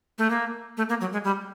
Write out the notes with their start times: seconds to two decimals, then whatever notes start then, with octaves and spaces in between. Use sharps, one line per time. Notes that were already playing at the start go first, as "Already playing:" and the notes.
0.18 A3
0.30 A#3
0.77 A3
0.89 A#3
1.01 F#3
1.13 G#3
1.24 G3